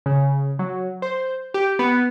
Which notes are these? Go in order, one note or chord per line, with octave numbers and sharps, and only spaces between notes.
C#3
F#3
C5
G4
B3